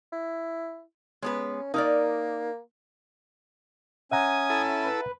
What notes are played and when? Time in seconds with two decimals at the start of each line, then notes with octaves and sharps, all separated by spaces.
0.12 E4
1.22 G#3 B3 C#4 B4
1.74 A#3 D#4 A#4 D5
4.11 C#4 E5 F#5 G#5 A#5 D#6 G#6
4.50 E4 A4
4.84 B4